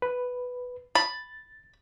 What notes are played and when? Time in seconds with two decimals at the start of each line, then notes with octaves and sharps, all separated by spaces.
0.02 B4
0.95 B5 A6